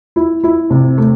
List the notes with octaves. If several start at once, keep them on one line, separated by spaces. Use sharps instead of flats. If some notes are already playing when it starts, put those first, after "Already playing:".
E4
E4
C3
A3